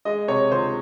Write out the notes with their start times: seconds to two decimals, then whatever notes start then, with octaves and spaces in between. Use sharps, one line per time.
0.05 G#3 D#5
0.28 C3 C#5
0.51 C#2 C5